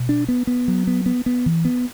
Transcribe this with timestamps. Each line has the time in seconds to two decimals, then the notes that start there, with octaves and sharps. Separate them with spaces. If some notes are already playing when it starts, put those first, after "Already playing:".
Already playing: B2
0.09 D4
0.28 B3
0.47 B3
0.68 F#3
0.87 B3
1.06 B3
1.26 B3
1.46 E3
1.65 B3